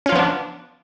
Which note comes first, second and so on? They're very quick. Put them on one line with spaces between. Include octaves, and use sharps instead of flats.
C#4 F4 F3 B3 D4